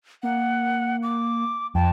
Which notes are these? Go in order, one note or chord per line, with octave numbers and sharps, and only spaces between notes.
A#3 F#5
D6
F2 G5 A5